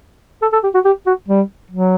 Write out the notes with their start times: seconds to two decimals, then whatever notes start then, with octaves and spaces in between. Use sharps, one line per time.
0.42 A4
0.53 A4
0.63 G4
0.74 F#4
0.85 G4
1.06 F#4
1.28 G3
1.71 F#3